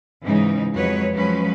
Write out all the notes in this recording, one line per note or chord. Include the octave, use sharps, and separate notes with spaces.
G#2 C#3 E3 D#4
F2 F#3 G#3 B4 C#5
F3 F#3 G#3 C#4 B4